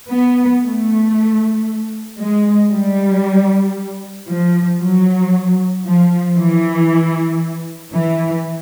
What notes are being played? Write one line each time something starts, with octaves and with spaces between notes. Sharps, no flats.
B3
A3
G#3
G3
F3
F#3
F3
E3
E3